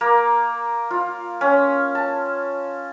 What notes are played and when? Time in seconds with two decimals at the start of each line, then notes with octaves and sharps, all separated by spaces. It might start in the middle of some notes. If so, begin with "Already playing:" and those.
0.01 A#3
0.91 F4
1.41 C#4
1.95 A5